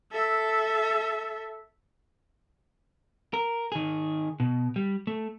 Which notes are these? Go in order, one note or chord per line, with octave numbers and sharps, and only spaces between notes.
A4 E5
A#4
D#3 G#4
B2
G3
A3